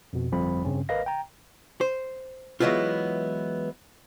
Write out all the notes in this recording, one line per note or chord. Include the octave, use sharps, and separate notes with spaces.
F2 B2
G1 F2 F3 G3 C4 B5
G2 C#3 C4 C#4
G#1 A#4 B4 D#5 F5 A#6
G5 A#5
C5
E3 F#3 G#3 B3 E4 F4